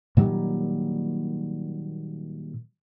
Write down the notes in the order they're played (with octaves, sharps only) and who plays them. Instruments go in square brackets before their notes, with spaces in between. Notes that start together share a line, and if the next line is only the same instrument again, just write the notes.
[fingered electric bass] A#2 D#3 F#3 G3